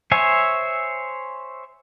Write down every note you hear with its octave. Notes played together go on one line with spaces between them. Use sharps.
C5 C#5 E5 G#5